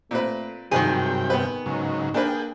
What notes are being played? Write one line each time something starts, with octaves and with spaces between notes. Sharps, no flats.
A#2 A3 C4 B4
A#1 G2 C3 D#3 F#3 G#4 B4 G5
B3 B4
G#2 C#3 F#3 D#4
A#3 D4 G#4 A#4 B4 G5